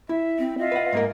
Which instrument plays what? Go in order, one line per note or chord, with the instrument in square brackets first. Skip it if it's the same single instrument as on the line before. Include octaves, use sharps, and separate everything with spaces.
[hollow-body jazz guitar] E4 [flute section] E5
[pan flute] C4
[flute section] F4 E5 [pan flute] D#5
[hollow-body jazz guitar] B4 F#5
G#2 A#3 A#4